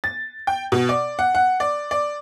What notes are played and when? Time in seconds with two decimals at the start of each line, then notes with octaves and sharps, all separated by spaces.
0.04 A6
0.47 G5
0.72 B2
0.89 D5
1.19 F#5
1.35 F#5
1.60 D5
1.91 D5